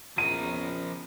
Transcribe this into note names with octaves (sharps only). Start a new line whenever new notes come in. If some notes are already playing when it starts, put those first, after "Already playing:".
E2 C#3 F3 A#4 D#7